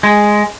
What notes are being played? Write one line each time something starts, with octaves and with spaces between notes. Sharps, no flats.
G#3